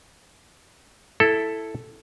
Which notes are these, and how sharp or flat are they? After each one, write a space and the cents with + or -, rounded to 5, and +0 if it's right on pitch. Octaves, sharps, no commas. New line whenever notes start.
E4 +0 A4 +0